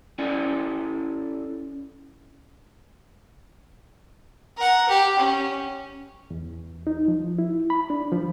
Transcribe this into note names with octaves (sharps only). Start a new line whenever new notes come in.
C#4 E4 A4 D5 G#5
A#4 F#5
G4
C#4
E2
D#4
F3
E4
B5
D4
F3